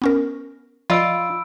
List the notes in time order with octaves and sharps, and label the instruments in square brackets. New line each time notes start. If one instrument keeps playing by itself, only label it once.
[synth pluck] B3 C#4 A#4
[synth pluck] F3 D5 D#5 [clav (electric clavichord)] F4 [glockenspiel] B5 E6 D7